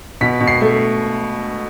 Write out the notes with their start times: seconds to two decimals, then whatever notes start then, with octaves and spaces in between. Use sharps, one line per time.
0.21 B2 B6
0.41 B2
0.48 C7
0.61 A3